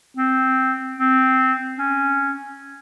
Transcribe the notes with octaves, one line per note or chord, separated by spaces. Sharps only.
C4
C4
C#4